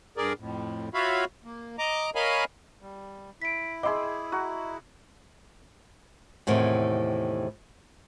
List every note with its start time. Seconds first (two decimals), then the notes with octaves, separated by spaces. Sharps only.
0.17 G2 G#4 A#4 D5
0.39 F2 A2
0.94 F4 F#4 C#5 E5 F5 B5
1.44 A#3
1.78 D#5 A#5 D6
2.15 A#4 C#5 D#5 F5 G#5 B5
2.81 G3
3.42 E4 B6 D7
3.83 G#4 D#5 E5 G5 B5 C6 D6
4.32 F#4 A#5
6.47 E2 A2 C3 D#3